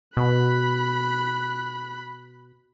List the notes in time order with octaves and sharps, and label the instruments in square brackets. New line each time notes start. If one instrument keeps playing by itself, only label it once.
[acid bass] B2 [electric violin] B5 F#6